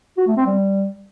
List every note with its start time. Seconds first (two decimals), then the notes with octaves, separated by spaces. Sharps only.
0.18 F#4
0.27 A3
0.37 C4
0.46 G3